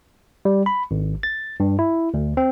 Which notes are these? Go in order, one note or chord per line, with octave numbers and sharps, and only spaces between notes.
G3
B5
G#1
A6
G2
E4
D2
C4